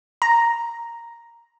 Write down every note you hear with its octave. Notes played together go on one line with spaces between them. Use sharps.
A#5